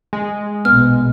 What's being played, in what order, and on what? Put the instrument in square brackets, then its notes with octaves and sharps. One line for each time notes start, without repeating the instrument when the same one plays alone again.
[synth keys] G#3
[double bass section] A#1 B2 [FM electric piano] B3 [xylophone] F6